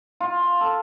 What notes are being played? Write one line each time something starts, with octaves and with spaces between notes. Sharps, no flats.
F4
A4